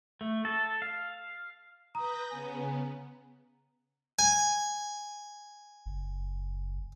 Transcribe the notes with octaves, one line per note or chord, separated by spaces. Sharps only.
A3
A4
F5
B4 A#5 D#6 G6 A#6
C#3 B3 G#5
G#5
F#1